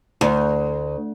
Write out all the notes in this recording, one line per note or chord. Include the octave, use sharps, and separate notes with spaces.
D2